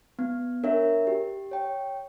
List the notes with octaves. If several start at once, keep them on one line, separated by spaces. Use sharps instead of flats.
B3
D4 A#4 C#5 E5
G4
C#5 G5